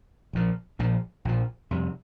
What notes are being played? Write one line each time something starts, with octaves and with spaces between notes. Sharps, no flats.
A#1 A#2 F3
A#1 A#2 F3
A#1 A#2 F3
F2 C3 G3